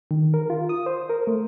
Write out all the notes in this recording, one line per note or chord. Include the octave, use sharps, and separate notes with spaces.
D#3
A#4
F4
D#6
C5
A#4
A3